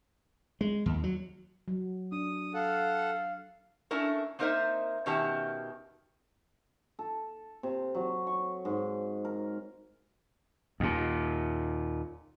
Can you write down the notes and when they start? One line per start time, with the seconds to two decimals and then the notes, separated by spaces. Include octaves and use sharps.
0.61 G#3
0.86 D#2
1.04 F#3
1.68 F#3
2.12 D4 D#6
2.54 A4 F5 F#5
3.91 A3 C#4 D4 E4 A4 A#4
4.39 A#3 C4 D#4 A#4 C5 E5
5.06 B2 D#3 C#4 G4 E5 A5
6.99 A4
7.63 C3
7.95 F#3
8.27 C#6
8.65 G#2
9.25 A#4
10.80 D#2 A#2